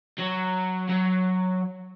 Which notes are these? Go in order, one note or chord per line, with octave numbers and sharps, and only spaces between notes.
F#3
F#3